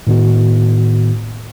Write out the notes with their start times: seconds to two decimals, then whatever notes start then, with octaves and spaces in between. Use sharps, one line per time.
0.07 A2 D#3 B3 F#4